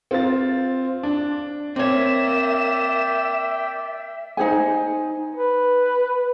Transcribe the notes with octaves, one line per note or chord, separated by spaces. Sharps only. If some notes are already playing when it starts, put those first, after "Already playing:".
C4 F4 A6
D4
A#3 C4 C#5 D5 E5 G5 E7
D#4 G#4 C5 G#5
B4